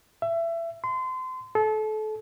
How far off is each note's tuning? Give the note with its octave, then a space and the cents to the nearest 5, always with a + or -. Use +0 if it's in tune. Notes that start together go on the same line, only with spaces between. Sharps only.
E5 +25
C6 -30
A4 -30